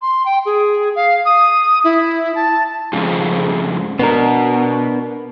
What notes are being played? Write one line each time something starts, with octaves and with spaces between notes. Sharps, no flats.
C6
G5
G#4
F5
D#6
E4
A5
F2 G#2 C#3
B2 B3 D4 A#4